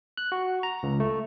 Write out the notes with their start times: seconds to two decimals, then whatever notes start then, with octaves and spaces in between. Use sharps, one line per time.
0.17 F#6
0.32 F#4
0.63 A#5
0.83 C#2
1.00 A3